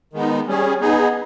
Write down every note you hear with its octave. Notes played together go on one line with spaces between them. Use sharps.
D#3 G#3 B3 D#4
G3 C#4 G#4
B3 D#4 G#4